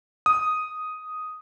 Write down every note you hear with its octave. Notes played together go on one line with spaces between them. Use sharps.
D#6